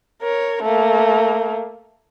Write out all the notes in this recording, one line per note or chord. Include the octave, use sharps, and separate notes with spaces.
A#4 C#5
A3 A#3